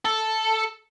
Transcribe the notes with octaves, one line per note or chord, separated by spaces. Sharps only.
A4